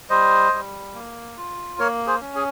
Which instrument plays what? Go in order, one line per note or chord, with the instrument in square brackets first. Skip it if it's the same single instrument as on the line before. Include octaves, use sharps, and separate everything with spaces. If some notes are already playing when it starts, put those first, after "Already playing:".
[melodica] G3 C5 D#5
G3
A#3
F4
A#3 A#4 C#5
G#4 C5
C#4
G#4